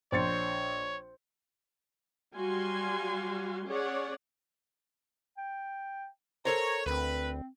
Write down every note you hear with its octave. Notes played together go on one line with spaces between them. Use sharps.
A#1 C5 C#5 A6 C#7
F#3 G3 F#4 F5 G#5 C6
C#4 G#4 C#5 D5 F#5
G5
A4 A#4 C5 C#5 A#5
D2 C4 B4